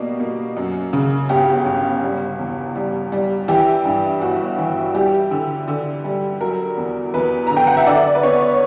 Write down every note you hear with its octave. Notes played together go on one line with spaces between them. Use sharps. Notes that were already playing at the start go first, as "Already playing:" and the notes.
Already playing: B2 G3 A#3
A#3
F#2
C#3
G1 G4
G1
G3
E2
G3
G3
E3 G4
G2
G1 F#4
E3
G3 G4
D3
D3
G3
F#3 A#4
E2
E2 B4
D3 A#5
G5
F#5
E5
D3 D5
B4
B3 C#5